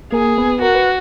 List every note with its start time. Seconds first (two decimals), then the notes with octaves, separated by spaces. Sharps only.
0.12 A#3 G#4 A#4
0.38 B3 B4
0.62 F#4 A#4
0.75 B4